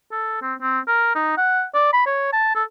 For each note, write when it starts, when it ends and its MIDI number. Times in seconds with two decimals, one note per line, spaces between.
0.12 0.41 69
0.42 0.54 60
0.61 0.79 60
0.88 1.11 70
1.15 1.32 63
1.37 1.64 78
1.74 1.88 74
1.93 2.05 83
2.06 2.32 73
2.33 2.53 81
2.55 2.63 69